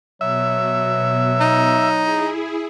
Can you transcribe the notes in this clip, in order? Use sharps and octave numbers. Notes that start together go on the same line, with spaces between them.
B2 F#3 E5
D#4
E4 G#4